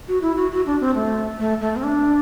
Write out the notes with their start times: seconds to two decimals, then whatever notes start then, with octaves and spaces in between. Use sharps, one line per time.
0.08 F#4
0.22 E4
0.37 F#4
0.51 F#4
0.66 D4
0.81 C4
0.95 A3
1.39 A3
1.60 A3
1.76 C4
1.83 D4